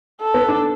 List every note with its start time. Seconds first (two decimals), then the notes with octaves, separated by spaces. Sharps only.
0.21 A4
0.34 B3
0.49 D4